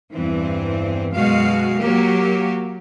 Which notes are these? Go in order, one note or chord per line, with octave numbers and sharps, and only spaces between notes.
E2 G2 E3 C4
F#2 B2 G#3 F#4 F5
F#3 A#3 G4